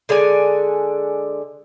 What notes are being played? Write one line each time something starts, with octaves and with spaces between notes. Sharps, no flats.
D3 G#3 D5 G#5